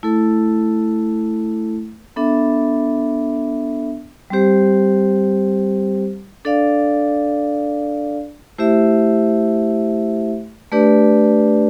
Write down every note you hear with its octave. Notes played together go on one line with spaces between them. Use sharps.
A3 E4 A4
B3 D4 A4 E5
G3 C4 G4 C5
D4 A4 D5 F5
A3 E4 G4 C5 E5
A3 D4 G4 B4 D5